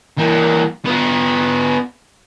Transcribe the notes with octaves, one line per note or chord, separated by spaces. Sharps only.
E3 A#3
B3 F4